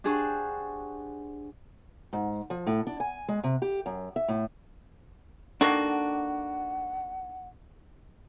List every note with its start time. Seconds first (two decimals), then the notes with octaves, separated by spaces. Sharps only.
0.04 D4 G4 G#4 C5 F#5 C#6
2.13 G#2
2.50 F3
2.67 A2
2.87 D4
3.00 G#5
3.28 G#3
3.44 C3
3.62 G4
3.86 F#2
4.16 E5
4.28 A2
5.61 D#3 A#3 D4 F#4 A4 F#5